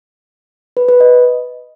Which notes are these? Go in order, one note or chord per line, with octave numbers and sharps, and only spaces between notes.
B4
B4
D#5